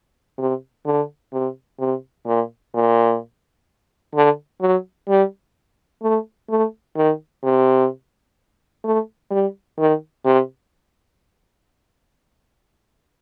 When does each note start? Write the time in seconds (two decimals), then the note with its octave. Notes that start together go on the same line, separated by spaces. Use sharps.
0.38 C3
0.86 D3
1.33 C3
1.79 C3
2.26 A#2
2.74 A#2
4.15 D3
4.61 F#3
5.08 G3
6.02 A3
6.50 A3
6.96 D#3
7.44 C3
8.85 A3
9.31 G3
9.78 D#3
10.25 C3